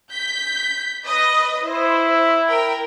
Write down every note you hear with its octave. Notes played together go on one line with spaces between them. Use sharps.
G6 B6
B4 D#5
E4 C5
A#4 G5